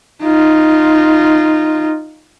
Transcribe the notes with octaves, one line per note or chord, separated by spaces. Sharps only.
D#4 F4